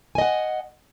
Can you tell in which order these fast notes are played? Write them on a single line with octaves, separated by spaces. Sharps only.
G#5 D#5 F#5